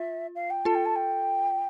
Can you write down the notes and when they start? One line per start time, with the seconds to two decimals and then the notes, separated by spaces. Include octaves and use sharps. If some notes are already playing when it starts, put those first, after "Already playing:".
Already playing: F4 E5
0.35 F5
0.50 G5
0.65 F4 A4 A5
0.75 G5
0.86 A5
0.96 G5